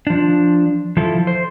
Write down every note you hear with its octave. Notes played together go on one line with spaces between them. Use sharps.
F3 D4
F3 E4 A4
C5